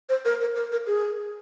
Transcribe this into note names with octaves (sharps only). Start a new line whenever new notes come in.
C5
A#4
A#4
A#4
A#4
G#4